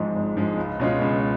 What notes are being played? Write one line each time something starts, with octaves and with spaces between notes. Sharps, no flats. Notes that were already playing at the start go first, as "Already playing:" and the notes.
Already playing: G#1 G#2 F3 G#3
G#1
G#2 F3 G#3
C#2
B2 G#3 C#4 F4
C#2